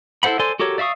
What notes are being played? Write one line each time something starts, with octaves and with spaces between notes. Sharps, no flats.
E4 A4 C5 F#5 B5
A4 C5 D5 G#5 C6
F#4 G4 A4 A#4 C#5
D5 E5 F5 C#6 D#6